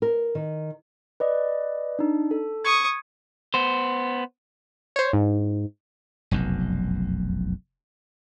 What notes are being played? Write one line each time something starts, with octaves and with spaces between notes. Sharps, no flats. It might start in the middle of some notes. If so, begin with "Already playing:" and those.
A#4
D#3
B4 D5 D#5
D4 D#4
A4
C#6 D#6 G#6
B3 C5
C5 C#5
G#2
F1 B1 F#2